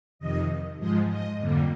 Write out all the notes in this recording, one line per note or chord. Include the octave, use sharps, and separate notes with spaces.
F2 C3 D#3 D#5
G#2 F3 G#3 D#5
D#5
F2 D3 G3 A#3